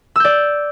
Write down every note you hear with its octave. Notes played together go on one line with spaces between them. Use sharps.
D5 E6 G6